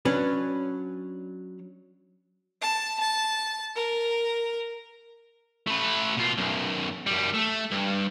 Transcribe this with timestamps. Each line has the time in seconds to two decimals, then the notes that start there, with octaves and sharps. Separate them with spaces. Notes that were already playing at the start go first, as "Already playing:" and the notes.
0.05 F#3 C#4 D4 B4
2.61 A5
3.00 A5
3.76 A#4
5.67 A3 B4
6.17 B2 F4
6.38 B1 F#2
7.07 F#2 G3
7.34 A3
7.71 G2